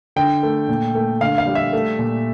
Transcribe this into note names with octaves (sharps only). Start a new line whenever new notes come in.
D3 G5
A3
A#2
A3
D3 F5
F5
G3
E5
A3
A#2